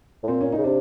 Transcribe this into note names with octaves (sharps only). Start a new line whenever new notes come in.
A2
A#2 C4
C#4
D#4
C#3
C3 D4